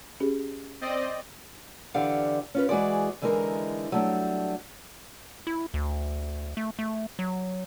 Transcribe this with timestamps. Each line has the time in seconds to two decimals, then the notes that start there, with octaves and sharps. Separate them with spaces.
0.20 C#4 G4 G#4
0.81 C4 D5 D#5
1.94 D3 E3 G4 D5 F5 F#5
2.54 C#4 F4 B4
2.69 E3 G#3 F#4 G#4 D5
3.22 D3 E3 G#3 D#4 A#4
3.92 F#3 G3 A3 D4
5.47 E4
5.74 D2
6.57 A3
6.79 A3
7.19 F#3